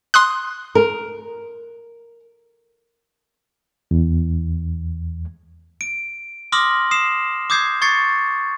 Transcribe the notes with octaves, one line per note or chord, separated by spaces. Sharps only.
C6 D#6 F#6
A#4
E2
D7
C6 D6 D#6 F6 A#6 F#7
D#6 C7 E7
D6 D#6 G6 G#6 C7
C#6 G#6 A6 C7 C#7